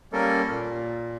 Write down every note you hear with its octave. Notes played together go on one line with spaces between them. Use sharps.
G3 A#3 C#4 A4 A#4
A#2